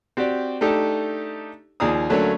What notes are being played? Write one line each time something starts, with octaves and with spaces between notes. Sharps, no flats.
C4 F#4 G4 D5
A3 D4 D#4 G4 A4
D#2 F3 G#4 D5 A#5 D#6
D3 F#3 A3 A#3 C#4 D4